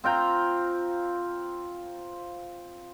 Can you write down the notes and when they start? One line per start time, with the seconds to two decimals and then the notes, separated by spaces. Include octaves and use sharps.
0.04 C4 F4 G5 A#5